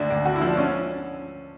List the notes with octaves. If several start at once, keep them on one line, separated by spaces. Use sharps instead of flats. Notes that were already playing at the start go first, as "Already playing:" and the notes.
Already playing: D2 D4
D2
D3 F#4
E4
F3
D4
C#4